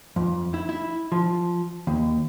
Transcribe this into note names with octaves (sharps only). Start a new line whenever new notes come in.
F2
E4
E4
F3
D#2